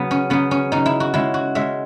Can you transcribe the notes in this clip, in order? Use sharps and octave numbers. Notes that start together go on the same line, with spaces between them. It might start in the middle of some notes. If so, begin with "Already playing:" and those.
Already playing: C#3 F#3 B3
C#4
C#3 F#3 B3
C#4
C#3 F#3 D#4
E4
F#4
C#3 G#3 E4
F#4
C#3 G#3 E5